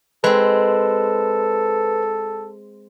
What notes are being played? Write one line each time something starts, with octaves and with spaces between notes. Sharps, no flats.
G#3 C4 A4 B4